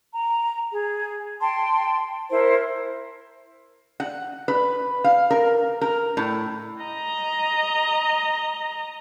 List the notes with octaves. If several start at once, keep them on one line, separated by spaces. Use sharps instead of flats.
A#5
G#4
G5 A5 C6
E4 A#4 C5
F#5
B4
F5
A#4
A#4
A2
D#5 A#5